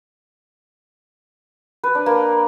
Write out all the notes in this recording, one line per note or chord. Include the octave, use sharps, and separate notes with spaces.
B4
D4
A#3